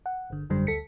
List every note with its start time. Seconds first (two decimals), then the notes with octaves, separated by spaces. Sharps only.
0.06 F#5
0.30 G1 D3
0.50 G#1 F#2 D3 G3 C5
0.67 D2 A4 B6 C#7